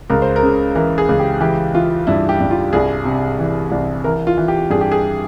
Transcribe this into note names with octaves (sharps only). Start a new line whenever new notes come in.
C#2 A#4
C5
A#4
C#3
E3 A#4
G#4
C#2
G4
E3 G4
E3 F4
G2 E4
G4
G2
F4
C2 G#4
C3
E3
C2
E3 A#4
F4
E3
G4
G2 G#4
G4
G#4